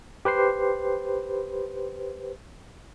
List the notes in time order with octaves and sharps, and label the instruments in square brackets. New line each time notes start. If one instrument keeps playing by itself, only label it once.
[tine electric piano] G4 B4 C5 C7